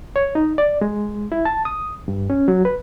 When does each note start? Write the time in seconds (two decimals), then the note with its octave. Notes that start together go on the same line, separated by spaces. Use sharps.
0.16 C#5
0.35 D#4
0.58 D5
0.81 G#3
1.32 E4
1.45 A5
1.65 D#6
2.08 G2
2.30 C#4
2.48 F#3
2.65 B4